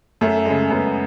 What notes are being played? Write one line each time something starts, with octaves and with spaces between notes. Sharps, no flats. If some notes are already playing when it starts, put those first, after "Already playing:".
F#2 A3
C#3 G#3
F#2 B3